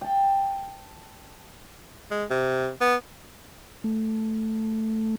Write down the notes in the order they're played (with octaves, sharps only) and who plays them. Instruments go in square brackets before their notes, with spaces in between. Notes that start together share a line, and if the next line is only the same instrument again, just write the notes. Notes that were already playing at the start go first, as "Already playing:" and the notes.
[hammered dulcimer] G5 A5
[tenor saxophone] G#3
C3
B3
[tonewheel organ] A3